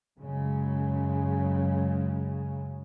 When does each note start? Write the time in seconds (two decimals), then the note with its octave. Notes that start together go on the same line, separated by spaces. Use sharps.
0.18 F#2 C#3 F#3 G#3